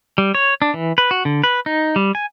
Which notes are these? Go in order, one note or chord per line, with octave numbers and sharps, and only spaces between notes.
G3
C#5
D4
E3
B4
F#4
D3
B4
D#4
G3
G#5